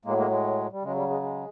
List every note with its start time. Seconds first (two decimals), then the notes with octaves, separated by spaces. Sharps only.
0.05 A2 F#3 G#3 A#3
0.18 G#3 A#3
0.31 G#3
0.72 G3
0.82 C#3 F#3 G#3
0.96 G3
1.09 G#3
1.22 G#3